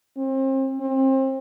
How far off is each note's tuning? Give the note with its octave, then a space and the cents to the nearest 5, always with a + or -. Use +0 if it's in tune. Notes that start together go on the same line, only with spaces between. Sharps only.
C4 +35
C4 +30